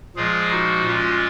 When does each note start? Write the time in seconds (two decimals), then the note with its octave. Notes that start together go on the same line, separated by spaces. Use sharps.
0.16 A#2 F3 G#3 F4 G#4
0.50 D#4 F#4
0.86 A#2 G#3 C#4 F4